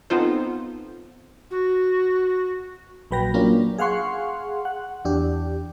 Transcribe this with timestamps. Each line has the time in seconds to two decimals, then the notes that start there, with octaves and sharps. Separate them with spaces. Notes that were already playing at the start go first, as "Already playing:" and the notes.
0.10 B3 C4 D#4 F4 A4 C5
1.51 F#4
3.11 A#1 F#3 B4 G5 A#6
3.34 F#3 A#3 C#4 D4 F4
3.78 G#4 F5 F#5 C6 C#6
4.65 F#5
5.05 E2 D4 G4